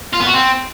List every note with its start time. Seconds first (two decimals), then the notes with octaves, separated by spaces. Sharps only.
0.13 F4
0.20 B3
0.27 F#4
0.34 C4